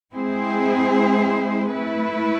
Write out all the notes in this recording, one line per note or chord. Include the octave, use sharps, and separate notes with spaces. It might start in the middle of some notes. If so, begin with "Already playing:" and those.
G#3 C4 E4 G#4 C5
A3 E4 B4